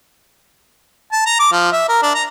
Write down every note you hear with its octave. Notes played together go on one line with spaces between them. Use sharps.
A5
A#5
D6
F3
E5
A#4
D4
A#5